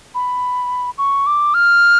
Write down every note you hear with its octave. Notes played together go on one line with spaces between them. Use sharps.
B5
C#6
D6
F6